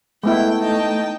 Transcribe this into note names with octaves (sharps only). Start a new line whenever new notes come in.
G#3 A3 B3 E4 G5
D#4 G5 A5